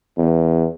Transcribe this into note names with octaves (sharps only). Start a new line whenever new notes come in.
E2